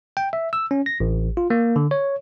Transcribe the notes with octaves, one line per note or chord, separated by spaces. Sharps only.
G5
E5
E6
C#4
A#6
A1
F4
A#3
D3
C#5